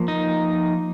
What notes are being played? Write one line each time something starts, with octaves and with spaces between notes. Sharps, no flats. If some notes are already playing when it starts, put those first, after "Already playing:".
Already playing: F3 A#3
D#4